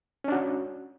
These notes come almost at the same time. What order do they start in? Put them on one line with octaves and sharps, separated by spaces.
C#4 D4 F#4